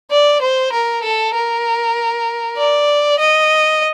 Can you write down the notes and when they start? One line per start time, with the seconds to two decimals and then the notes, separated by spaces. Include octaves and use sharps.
0.11 D5
0.41 C5
0.72 A#4
1.03 A4
1.34 A#4
2.57 D5
3.19 D#5